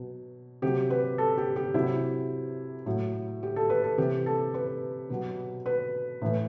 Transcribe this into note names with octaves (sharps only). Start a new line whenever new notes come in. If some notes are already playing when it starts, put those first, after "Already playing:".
Already playing: B2 F#3
C3 F#3 G4
B4
A4
G4
G4
C3 F#3 E4
A2 F#3
G4
A4
B4
A4
C3 E3 G4
A4
B4
B2 F#3
B4
A2 E3